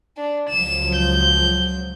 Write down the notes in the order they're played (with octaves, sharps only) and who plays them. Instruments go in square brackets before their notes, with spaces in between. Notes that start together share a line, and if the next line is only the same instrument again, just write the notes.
[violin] D4
[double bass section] C#2 F3 F#3 [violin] E7
[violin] G6